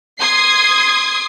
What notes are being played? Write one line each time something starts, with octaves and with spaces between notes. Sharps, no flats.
C6 D#6 G#6 C7